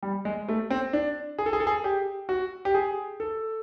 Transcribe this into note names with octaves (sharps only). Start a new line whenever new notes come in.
G3
G#3
A3
C4
D4
G#4
A4
G#4
A4
G#4
G4
F#4
G4
G#4
A4